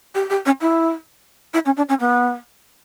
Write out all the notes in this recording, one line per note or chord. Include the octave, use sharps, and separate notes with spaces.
G4
G4
C#4
E4
E4
C#4
D4
C#4
B3